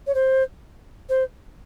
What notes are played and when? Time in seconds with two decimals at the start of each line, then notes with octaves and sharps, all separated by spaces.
0.07 C#5
0.15 C5
1.09 C5